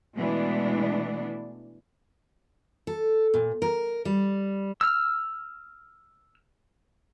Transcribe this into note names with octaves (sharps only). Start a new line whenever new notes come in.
B2 E3 G#3 A3 B3 D4
A4
A#2
A#4
G3
E6 F6